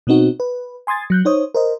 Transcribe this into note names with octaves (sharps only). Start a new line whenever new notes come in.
B2 B3 C4 D#4 F#4
B4
G#5 C6 D#6 G#6 A6
F#3 F#6 G6
D#4 C5 C#5 D#6
A#4 C5 D#5